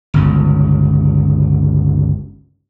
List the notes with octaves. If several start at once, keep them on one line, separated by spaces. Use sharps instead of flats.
G1 C#2